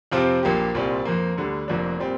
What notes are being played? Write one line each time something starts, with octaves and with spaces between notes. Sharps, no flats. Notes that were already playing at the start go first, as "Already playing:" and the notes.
F2 C3 F3 C4 F4
A#1 A#2 A#3 G4
C2 A#2 G3 C4
F2 F3 A#3
D2 D3 G3
F1 F2 F3 A#3 D4
A#2 G3 C4